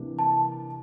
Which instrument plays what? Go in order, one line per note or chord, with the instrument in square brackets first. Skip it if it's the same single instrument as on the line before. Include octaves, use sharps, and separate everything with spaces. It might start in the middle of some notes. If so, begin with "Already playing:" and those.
Already playing: [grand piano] C3 E3 A#3 D4
[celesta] A5